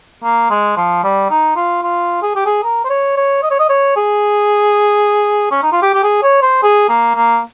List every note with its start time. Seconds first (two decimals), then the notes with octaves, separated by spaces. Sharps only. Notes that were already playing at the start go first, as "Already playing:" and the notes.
0.23 A#3
0.50 G#3
0.77 F3
1.04 G3
1.30 D#4
1.56 F4
1.83 F4
2.23 G#4
2.35 G4
2.46 G#4
2.63 A#4
2.85 C5
2.90 C#5
3.17 C#5
3.43 D#5
3.51 C#5
3.59 D#5
3.69 C#5
3.97 G#4
5.51 C#4
5.63 D#4
5.72 F4
5.82 G4
5.94 G4
6.03 G#4
6.23 C#5
6.42 C5
6.63 G#4
6.89 A#3
7.15 A#3